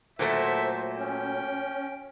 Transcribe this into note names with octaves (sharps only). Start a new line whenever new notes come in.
A#2 F#3 A3 C5 E5
C#4 G5